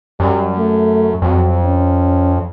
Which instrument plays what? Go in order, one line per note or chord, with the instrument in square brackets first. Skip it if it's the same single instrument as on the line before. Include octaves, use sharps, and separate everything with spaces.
[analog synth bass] F#2 [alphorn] G3
[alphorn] A3
[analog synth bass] F2 [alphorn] F#3
[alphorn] C#4